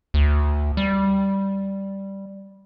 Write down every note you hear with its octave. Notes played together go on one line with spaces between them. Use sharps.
D2
G3